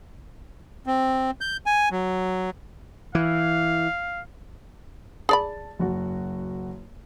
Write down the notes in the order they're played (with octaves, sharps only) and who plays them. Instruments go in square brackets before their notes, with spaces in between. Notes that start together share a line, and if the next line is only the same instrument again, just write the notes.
[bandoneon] C4
G6
G#5
F#3
[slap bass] E3 [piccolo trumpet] F5
[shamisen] G#4 D5 B5 [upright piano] A5 A6
[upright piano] F#1 F#4